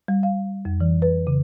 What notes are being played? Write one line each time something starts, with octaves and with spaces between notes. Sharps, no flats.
G3
F5
F2
E3
B4
C#3